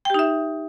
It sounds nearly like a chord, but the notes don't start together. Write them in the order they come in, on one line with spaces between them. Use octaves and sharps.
G5 G4 D#4 E5